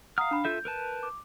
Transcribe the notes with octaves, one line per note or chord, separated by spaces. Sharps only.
F5 F#5 A#5 D#6 F6
D4 B5
F4 A4 E5 G6
A#4 B4 A5
D6